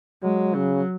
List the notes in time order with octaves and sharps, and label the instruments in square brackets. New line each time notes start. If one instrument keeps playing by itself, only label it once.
[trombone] F#3 [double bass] G#3
[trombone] C#3 [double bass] F#3